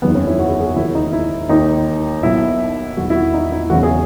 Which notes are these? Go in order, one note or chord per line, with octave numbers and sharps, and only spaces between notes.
F#1 E2 D#3 B3
C#4
E4
F#4
G#4
G#4
F#4
E1 D#2 C#3 E4
D#4
E4
D#2 D#3 D#4
B1 B2 E4
E1 E2 D#3 F#4
E4
F#4
D#4
E4
E1 E2 C#3 F#4
G#4